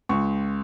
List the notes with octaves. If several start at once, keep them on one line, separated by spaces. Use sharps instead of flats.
C#2 C#6